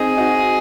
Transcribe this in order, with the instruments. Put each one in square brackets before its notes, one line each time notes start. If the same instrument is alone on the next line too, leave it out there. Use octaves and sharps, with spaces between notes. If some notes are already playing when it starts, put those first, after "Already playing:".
Already playing: [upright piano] C4 D#4 [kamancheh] G#4
[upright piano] D#4 F#4